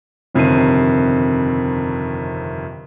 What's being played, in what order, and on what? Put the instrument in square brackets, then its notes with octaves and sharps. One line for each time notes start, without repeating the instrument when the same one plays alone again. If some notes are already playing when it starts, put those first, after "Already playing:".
[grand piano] G1 F2 C3 D#3 C7 D#7